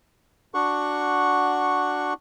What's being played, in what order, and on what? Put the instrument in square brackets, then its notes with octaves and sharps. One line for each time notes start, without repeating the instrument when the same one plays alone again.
[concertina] D4 F#4 F#5 C#6